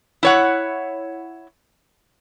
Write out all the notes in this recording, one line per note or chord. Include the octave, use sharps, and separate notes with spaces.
E4 C#5 F#5